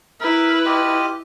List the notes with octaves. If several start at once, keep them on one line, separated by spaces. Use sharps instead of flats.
E4 A#4 B4
F4 G4 D#5